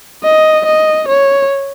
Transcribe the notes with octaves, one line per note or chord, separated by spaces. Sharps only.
D#5
D#5
C#5